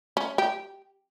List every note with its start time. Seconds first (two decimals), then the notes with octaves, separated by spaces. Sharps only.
0.17 C#4
0.38 G4